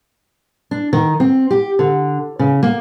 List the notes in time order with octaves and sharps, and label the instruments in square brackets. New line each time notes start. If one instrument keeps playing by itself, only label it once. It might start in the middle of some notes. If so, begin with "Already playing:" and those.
[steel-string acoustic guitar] D4
D#3
C4
G4
D3
C#3
A#3